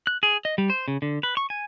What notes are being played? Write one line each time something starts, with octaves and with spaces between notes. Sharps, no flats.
F#6
G#4
D#5
G3
C5
C#3
D3
B4
C#6
G#5